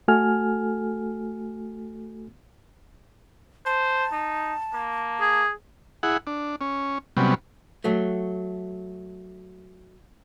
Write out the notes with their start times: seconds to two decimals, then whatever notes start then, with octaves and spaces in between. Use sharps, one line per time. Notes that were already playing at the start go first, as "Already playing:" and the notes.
0.08 A3 F#4 A4 G#5 F6
3.66 C5 A5
4.12 D#4
4.73 A#3
5.21 G#4
6.03 E4 G#4 F#5
6.27 D4
6.61 C#4
7.17 C3 F#3 G3 B3 C#4
7.84 F#3 A3